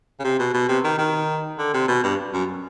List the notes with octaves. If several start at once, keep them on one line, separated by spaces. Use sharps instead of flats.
C#3
C3
B2
B2
C3
D#3
D#3
D3
C3
B2
G2
F#2